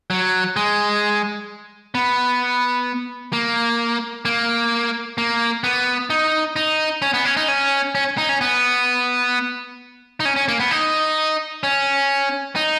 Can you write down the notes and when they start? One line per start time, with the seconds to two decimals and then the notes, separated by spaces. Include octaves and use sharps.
0.10 F#3
0.56 G#3
1.95 B3
3.33 A#3
4.25 A#3
5.18 A#3
5.64 B3
6.10 D#4
6.56 D#4
7.02 C#4
7.14 B3
7.25 C#4
7.37 D#4
7.48 C#4
7.95 C#4
8.18 D#4
8.29 C#4
8.41 B3
10.20 D#4
10.25 C#4
10.36 C#4
10.48 A#3
10.60 B3
10.71 D#4
11.63 C#4
12.56 D#4